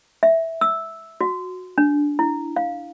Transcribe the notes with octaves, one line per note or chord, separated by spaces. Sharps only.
E5
E6
F#4
D4
E4
F5